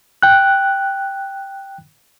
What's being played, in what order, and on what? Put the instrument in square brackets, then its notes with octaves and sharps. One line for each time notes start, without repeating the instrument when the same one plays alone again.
[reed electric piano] G5 F#6